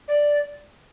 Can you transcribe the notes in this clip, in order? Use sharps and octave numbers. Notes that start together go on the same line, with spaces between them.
D5